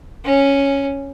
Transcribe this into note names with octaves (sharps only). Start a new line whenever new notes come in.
C#4